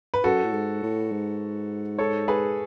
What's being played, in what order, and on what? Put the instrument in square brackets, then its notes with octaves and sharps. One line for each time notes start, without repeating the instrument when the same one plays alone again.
[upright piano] B4
[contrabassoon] F#2 [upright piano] F#4 A4
[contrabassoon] A2
G#2
A2
G#2
[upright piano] A4 C#5
G#4 B4